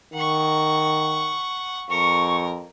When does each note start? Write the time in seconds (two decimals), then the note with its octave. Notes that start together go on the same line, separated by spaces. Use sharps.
0.14 D#3 F#5 C#6
1.90 F2 A#4 C#6